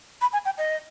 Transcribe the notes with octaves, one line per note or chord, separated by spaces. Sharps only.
B5
G#5
G5
D#5